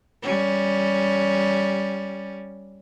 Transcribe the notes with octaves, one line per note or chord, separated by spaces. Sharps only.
G3 C#4